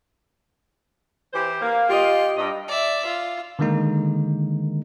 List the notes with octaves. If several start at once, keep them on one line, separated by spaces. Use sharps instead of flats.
E3 G4 C5
A#3
F4 G4 D#5
G2 D#5
D5 E5
F4
D3 D#3 G#3 A#3 D#4